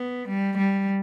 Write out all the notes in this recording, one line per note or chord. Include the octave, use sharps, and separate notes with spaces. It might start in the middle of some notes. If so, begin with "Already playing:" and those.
Already playing: B3
G3
G3